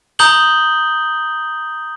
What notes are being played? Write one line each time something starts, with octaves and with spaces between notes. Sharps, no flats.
A#5 D#6 G6 F#7 G7